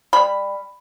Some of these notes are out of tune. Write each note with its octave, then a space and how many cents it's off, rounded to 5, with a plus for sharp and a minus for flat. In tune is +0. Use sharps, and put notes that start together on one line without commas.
G3 +20 B5 +0